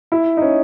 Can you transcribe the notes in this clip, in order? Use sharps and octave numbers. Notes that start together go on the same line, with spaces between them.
E4
D#4
C#4